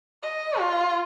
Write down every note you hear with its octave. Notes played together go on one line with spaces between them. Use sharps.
D#5
F4